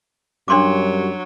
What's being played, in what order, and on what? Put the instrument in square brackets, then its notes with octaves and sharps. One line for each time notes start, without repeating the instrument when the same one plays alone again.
[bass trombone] F#2 [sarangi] F#3 [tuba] G3 [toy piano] D4 C6 D6